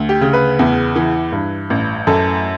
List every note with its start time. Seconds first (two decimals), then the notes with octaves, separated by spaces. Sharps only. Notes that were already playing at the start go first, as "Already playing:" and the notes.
Already playing: D2
0.09 G4
0.21 C#3
0.33 B4
0.59 E2
0.96 E3
1.32 G2
1.70 A1
2.07 F#2 A4